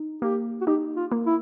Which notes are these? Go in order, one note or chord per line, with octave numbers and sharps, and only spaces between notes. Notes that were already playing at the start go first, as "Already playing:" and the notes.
Already playing: D#4
A#3 G4
F#4
D#4 G4
F4
A#3
E4